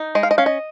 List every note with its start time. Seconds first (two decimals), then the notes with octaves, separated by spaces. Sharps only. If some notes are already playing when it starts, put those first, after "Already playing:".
Already playing: D#4
0.15 G#3 D#5
0.23 F5
0.31 D#5
0.38 C#4 F5
0.46 D#5